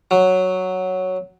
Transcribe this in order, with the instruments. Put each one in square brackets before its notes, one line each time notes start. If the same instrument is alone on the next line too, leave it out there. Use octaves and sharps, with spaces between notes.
[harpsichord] F#3